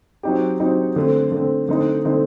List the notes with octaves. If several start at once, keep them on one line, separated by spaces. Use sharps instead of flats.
F#3 C4 D#4 G4
F#3 C4 D#4 G4
D3 A3 C4
D3 A3 C4
D3 A3 C4 D#4
D3 A3 C4 D#4